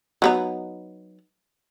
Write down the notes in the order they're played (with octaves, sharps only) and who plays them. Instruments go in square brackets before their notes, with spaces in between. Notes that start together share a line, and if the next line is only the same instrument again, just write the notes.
[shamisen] F#3 B3 D#4